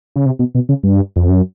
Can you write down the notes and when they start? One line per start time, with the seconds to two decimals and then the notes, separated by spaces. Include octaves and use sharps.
0.16 C#3
0.26 C3
0.39 B2
0.55 B2
0.69 C#3
0.83 G2
1.16 F2
1.29 F#2